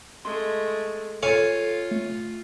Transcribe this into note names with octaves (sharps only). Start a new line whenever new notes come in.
G#3 A3 C6
F4 A4 C#5 F5 G#5
A3